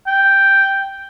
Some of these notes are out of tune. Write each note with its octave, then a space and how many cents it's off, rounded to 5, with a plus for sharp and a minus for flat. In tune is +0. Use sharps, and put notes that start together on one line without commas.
G5 +0